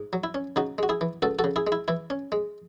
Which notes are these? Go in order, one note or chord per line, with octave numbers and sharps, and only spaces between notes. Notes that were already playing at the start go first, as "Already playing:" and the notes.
Already playing: G#2
F#3
E4
C#4
C#3 D#4 F#4
G#3 F#4
E4 G#4
E3
C#2 F#4 A4
F#4 A4
C#3
E4 G#4
G#3
E4
E3 E4
C#4
G#3